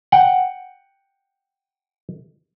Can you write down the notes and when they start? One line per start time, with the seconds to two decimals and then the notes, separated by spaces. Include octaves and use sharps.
0.12 F#5 G5